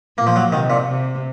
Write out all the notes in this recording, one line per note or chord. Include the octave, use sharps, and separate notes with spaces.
A#2 A#3
F3
F#3
C3 D#3
A#2
C3